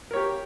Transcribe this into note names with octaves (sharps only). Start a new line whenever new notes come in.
G4 A#4 C#5